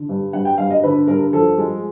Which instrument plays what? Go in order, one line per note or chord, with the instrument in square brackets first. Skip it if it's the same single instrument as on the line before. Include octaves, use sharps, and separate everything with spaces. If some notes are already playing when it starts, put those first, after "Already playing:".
Already playing: [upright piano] D3
G2
G2 F#5
G5
G2 F5
D#5
D3 B4
G2 A#4
F3 A4
G#3